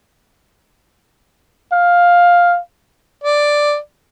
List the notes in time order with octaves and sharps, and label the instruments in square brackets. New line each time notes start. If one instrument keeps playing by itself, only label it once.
[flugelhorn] F5
[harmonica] D5